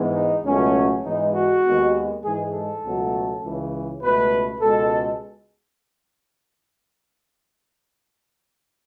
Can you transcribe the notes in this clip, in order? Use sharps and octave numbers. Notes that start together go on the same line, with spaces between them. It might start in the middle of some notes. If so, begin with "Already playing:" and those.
Already playing: G#2 E3 G#3 B3
D#4
C#2 B2 F#3 A3 C#4
G#2 E3 G#3 B3 D#4
F#4
D#2 D#3 G#3 B3
G#2 E3 G#3 G#4
A4
C#2 B2 F#3 A3
C#2 C#3 E3
C#2 B2 A3 B4
C#2 B2 G#3 A4